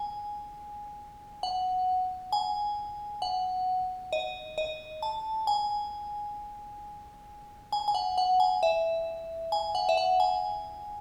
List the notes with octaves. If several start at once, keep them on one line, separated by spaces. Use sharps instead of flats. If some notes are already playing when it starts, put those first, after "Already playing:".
Already playing: G#5
F#5
G#5
F#5
D#5
D#5
A5
G#5
G#5
G#5
F#5
F#5
G#5
E5
G#5
F#5
E5
F#5
G#5